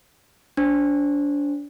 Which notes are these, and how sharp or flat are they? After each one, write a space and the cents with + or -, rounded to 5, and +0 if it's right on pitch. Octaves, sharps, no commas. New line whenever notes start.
D4 -30 C5 +0